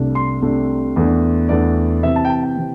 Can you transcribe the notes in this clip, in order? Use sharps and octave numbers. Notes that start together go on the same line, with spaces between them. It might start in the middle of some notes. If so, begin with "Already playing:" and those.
Already playing: C2 C3 A3 D4
C6
C2 C3 A3 D4
E2 E3 A3 D4
E2 E3 A3 D4 D5
C3 E3 C4 E5
A5
G5
A5
G5
C3 E3 C4